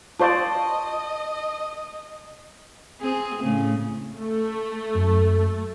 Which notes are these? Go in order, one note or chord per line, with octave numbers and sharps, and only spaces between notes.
F4 C5 D5 D#5 A5 C#6
C4 G#4
A2 C#3 A3
A3
F#2